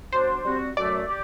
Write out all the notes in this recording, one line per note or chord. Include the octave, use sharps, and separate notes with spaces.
F#3 B3 D4 C5
G3 C4 F#4
F#2 F#3 A3 D5
G4